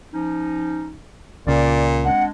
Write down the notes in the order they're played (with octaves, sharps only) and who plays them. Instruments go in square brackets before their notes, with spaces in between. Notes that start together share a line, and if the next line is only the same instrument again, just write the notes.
[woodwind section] F3 C#4 D#4
[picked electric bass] C#2 C#3 [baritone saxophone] A#2 [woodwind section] D5
[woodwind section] G#3 C4 D4 [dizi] F#5